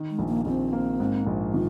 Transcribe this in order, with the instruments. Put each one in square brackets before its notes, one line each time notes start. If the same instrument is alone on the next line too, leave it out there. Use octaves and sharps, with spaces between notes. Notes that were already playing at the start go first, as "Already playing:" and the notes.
Already playing: [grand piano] D#3
[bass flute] G#3
[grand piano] A#1
[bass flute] A#3
[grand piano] A#1 [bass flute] C4
[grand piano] A#3
G#2
A#1
[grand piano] D#3 [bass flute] F4